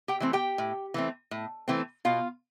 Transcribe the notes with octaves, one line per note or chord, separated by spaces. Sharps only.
G4 G5
E3 A3 C4
G4 G5
A2
E3 A3 C4
A2
E3 A3 C4
B2 F4 F5